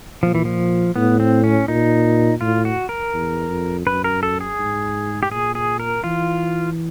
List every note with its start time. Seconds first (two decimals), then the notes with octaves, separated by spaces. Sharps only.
0.23 A#2 F3
0.35 E3
0.45 F3
0.96 A2 B3
1.20 C4
1.44 C#4
1.68 A#2 D#4
2.41 A2 F4
2.65 F#4
2.89 A#4
3.14 E2
3.49 F2
3.86 F#2 B4
4.04 A#4
4.23 A4
4.41 G#4
4.59 G#2
5.23 G4
5.31 A#2 G#4
5.55 G#4
5.80 A#4
6.04 E3 F4